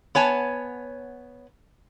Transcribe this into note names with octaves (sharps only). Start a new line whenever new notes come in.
B3 C#5 G#5 A5